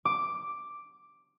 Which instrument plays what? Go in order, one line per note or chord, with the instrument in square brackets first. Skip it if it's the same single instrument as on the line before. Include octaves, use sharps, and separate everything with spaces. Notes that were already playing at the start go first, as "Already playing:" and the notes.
[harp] D6